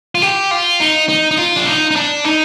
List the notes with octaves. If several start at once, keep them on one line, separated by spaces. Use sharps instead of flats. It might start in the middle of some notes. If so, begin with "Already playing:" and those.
F4
G4
F4
D#4
D#4
D#4
F4
D4
D#4
D#4
D4
D#4